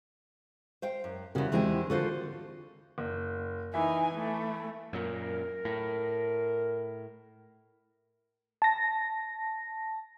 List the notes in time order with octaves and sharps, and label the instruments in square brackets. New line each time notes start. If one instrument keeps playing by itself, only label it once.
[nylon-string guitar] C5 F5 G5
F#2
[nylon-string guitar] E2 G3 [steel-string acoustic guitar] C#3 F#4 A#4
[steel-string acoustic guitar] E2 E4 G4 [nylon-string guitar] D#3 G#3 C4
[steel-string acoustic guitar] D3 F4 A#4 [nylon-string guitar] F#4 A4 C5
[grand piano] F#1
[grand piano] E3 E5 [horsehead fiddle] D#4 G#5
[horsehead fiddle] A3
[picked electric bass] F#2 A#2 [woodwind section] A#4
[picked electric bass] A2
[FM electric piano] A5 A#6